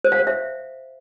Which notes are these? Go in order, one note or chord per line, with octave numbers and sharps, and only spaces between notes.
C5
F5
C5
E5